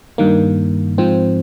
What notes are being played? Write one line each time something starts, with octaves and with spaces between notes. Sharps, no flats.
G2 D#3 A#3
G#2 F3 C4